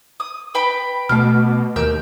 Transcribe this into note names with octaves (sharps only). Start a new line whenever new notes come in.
D#6
B4 G5 B5
B2 A3 D6 F6
D#2 A#4 E6 G6